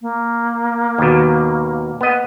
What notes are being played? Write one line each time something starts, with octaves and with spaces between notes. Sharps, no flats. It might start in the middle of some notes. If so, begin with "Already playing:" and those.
A#3
D#2 B2
B3 D#5